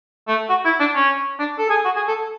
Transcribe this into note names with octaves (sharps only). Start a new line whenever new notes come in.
A3
F#4
E4
D4
C#4
D4
A4
G#4
F#4
G#4
A4